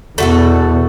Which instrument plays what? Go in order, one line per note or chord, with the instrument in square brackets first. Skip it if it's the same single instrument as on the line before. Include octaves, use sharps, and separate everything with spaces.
[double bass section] E2 B2 [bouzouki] A3 F#4 A4